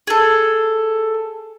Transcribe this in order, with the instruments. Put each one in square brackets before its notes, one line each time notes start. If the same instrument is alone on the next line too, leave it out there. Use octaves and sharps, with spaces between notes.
[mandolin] G#4 A4